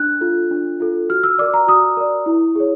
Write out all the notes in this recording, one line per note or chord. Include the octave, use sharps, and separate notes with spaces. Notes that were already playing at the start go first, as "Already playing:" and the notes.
Already playing: D4 F#6
F4 A4
D4
F4 A4
F#4 F6
E6
A#4 D5 D6
A#5
F#4 D#6
A#4 D5
E4
G#4 C#5